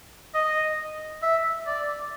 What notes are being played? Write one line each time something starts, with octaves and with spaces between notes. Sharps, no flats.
D#5
E5
D5